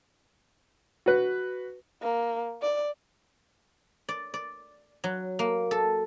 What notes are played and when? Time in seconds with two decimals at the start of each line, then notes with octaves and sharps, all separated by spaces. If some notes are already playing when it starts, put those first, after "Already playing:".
1.06 F#4 B4
2.02 A#3
2.62 D5
4.09 D5
4.34 D5
5.04 F#3
5.39 A#3
5.71 A4